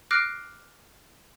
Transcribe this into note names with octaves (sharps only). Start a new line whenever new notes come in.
D6 F6 F#6 A#6 C7 D7